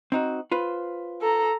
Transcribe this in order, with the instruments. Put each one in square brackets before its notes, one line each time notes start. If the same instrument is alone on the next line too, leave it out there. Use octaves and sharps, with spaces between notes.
[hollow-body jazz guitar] C4 D#4 F#4
F4 B4 C5
[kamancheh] A4 A#5